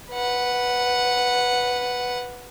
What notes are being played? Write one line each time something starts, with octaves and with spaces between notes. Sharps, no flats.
B4 F#5